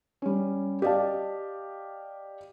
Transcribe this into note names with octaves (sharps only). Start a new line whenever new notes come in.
G3 C#4
G4 D5 D#5 F5 A5